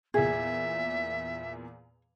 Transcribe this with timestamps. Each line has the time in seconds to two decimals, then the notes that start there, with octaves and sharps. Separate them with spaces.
0.14 E2 A#2 G#4 E5